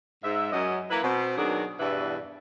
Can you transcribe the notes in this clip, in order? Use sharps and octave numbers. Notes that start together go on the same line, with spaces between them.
G#2 E5
F#2 D#5
E3 A#3 E4 B4
B2 C4
B2 D#3 F#3 D4 F#4 G#4
E2 G2 B2 E3 B4 E5